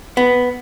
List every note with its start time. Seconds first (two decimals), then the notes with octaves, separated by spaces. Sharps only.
0.17 B3